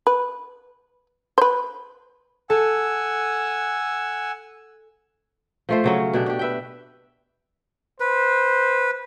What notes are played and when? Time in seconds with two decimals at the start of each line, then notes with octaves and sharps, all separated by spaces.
0.07 B4
1.38 B4 C5
2.50 A4 F#5 G#5 E6
5.69 F3 A3 C5
5.84 C#3 F#3 C#4
6.14 B2 D4 G4
6.26 D4 G4
6.39 B4 E5 G5
8.00 B4 C5